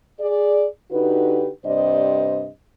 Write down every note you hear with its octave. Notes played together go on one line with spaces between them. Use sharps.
G#4 D5
D3 D#4 F#4 G4 B4
G2 C3 C5 D5 D#5